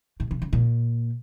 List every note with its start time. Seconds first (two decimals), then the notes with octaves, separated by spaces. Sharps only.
0.20 A2
0.31 C3
0.42 C#3
0.53 A#2